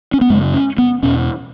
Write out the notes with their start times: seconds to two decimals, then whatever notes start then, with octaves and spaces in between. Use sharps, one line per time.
0.13 C#4
0.21 B3
0.30 F#2 G#3
0.34 C#3
0.54 C#4
0.78 B3
1.03 E2 B2 C#4